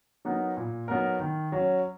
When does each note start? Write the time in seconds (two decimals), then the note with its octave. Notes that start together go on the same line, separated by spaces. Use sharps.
0.25 F#3 B3 D#4 A#4
0.57 A#2
0.88 F#3 B3 D#4 A#4
1.20 D#3
1.52 F#3 C#4